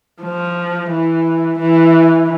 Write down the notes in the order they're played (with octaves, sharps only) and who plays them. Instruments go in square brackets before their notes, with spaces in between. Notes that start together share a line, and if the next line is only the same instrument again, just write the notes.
[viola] F3
E3
E3